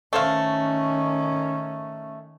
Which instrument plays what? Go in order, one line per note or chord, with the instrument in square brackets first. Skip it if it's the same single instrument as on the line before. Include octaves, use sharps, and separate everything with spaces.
[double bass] D#3 C#4 [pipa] A3 C5 F5